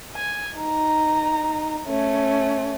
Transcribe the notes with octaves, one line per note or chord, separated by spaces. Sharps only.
G#5
D#4 A#5
A3 C#4